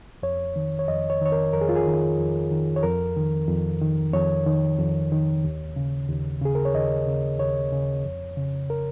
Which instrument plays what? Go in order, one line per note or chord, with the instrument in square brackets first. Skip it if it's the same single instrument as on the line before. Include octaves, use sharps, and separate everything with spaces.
[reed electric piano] F2 C#5
D#3
C#5
F2 D#5
C#5
D#3 C#5
A#4
F2 A#4
G#4
F4
G#4
D#3
F2
D#3
C#5
F2 A#4
D#3
F2
D#3
F2 C#5
D#3
F2
D#3
D#2
C#3
D#2
C#3 G#4
A#4
C#5
D#2 D#5
C#3
D#2 C#5
C#3
F2
C#3
A#4